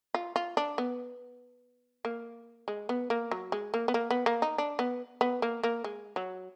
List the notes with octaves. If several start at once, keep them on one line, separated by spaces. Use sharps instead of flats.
F4
F4
D4
B3
A#3
G#3
B3
A#3
F#3
G#3
A#3
B3
A#3
B3
A#3
D#4
D4
B3
B3
A#3
A#3
G#3
F#3